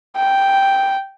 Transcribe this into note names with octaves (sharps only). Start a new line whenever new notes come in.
G5